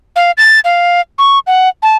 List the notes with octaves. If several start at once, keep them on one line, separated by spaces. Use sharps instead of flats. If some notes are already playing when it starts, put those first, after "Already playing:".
F5
A6
F5
C#6
F#5
A5